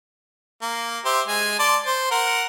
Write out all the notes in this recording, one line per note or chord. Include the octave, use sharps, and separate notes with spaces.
A#3
G4 C5 E5
G#3 G#5
D5 A5 C6
C5
A#4 F#5